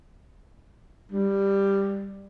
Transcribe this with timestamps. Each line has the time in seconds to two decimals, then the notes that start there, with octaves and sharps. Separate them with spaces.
1.12 G3